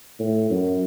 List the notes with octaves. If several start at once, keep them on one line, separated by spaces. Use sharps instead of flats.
A2
F#2